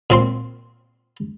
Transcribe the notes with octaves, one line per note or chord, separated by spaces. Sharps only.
A#2 C4 C6